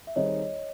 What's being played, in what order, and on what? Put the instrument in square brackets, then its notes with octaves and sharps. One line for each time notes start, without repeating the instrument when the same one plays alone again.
[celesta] E5
[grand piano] D#3 G3 C4 D#4 G#4 [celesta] C#5 D#5